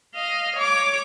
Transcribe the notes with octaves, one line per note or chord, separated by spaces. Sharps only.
D#5 F5
C#5 D6